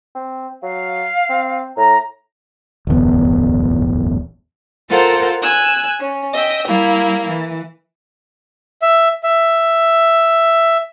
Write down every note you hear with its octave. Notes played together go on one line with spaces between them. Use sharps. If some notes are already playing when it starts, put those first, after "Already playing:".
C4
F#3 F5
C4
A2 A#5
D1 G1 E2 B3
F4 A4 A#4 C5 F5 F#5
G#5 E6 F#6
C#4
D#5 E5 G5
G3 A#3 E4 F5
E3
E5
E5